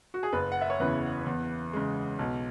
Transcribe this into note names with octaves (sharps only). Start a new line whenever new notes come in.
F#4
G#4
F#1 B4
F#5
E5
C#5
E2 C#3 E3 B4
E2
C#3 G#3
B1